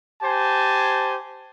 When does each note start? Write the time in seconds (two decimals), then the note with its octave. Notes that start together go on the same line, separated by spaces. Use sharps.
0.22 G4 C5 G#5 A5